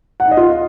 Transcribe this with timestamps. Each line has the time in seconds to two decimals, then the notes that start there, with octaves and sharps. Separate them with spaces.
0.20 F#5
0.26 D#4
0.31 D#5
0.37 F4